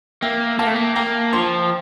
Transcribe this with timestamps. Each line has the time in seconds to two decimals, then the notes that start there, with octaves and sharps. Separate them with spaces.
0.22 A#3 E5 G5
0.59 A#3 F5 A5
0.66 A3
0.73 A#3
0.96 A#3 G5 A#5
1.32 F3 A5 C6